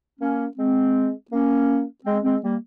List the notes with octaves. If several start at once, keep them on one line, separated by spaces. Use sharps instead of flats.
A#3 C#4
G#3 C4
A#3 C#4
G#3 C4
G#3 C4
G3 A#3